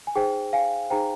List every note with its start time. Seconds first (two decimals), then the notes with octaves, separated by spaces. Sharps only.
0.07 G#5
0.16 D#4 G#4 C5 G5
0.53 F5 G#5
0.90 D#4 G#4 C5 G5 A#5